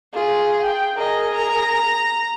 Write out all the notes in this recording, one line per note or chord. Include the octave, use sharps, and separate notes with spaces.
F4 G#4
G5
G#4 A#4 D#5
A#5